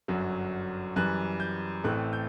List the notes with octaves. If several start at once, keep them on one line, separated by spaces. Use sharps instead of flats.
G1 F#2 F#3
F#2 E3 G3 F#6
G6
A1 A2 E3 A3 C4 F#6
G6